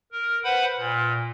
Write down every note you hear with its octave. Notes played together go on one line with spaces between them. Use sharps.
A#4
B4 C5 F#5 B5
A#2